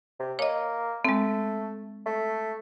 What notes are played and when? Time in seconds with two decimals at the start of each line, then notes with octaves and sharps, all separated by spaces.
0.19 C3
0.39 A#3 C#5 D#5
1.05 G#3 A3 C4
2.06 A3